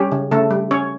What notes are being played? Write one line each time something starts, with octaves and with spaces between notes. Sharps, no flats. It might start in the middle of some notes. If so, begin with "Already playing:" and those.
Already playing: G3 C#4 G4
C#3
C#3 A3 A4
G3
C#4 C#5